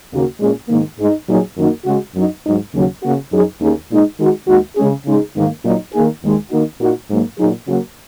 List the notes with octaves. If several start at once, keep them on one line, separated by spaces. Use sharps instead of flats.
D#2 C#3 A#3 F#4
A#2 G#3 C#4 G#4
G#2 D#3 A#3
G#2 G#3 D#4
A#2 F#3 D#4 G#4
F#2 D#3 A#3 D#4 F#4
C#3 G#3 F#4
F#2 F#3 D#4
G#2 F#3 D#4
D#2 C#3 F#3
C#3 A#3 F#4
F#2 F#3 D#4 G#4
D#2 D#3 A#3 C#4 G#4
A#2 G#3 D#4
D#3 G#3 D#4 F#4
D#2 D#3 G#3 F#4
C#3 G#3 C#4 G#4
C#3 G#3 D#4 G#4
G#2 D#3 A#3
A#2 F#3 D#4
D#3 A#3 D#4 G#4
D#2 D#3 G#3
D#3 A#3 D#4 F#4
A#2 A#3 D#4 F#4
G#2 F#3 A#3
A#2 F#3 D#4 G#4
C#3 F#3 A#3 F#4